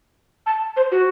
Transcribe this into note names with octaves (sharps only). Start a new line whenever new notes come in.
A5
C5
F#4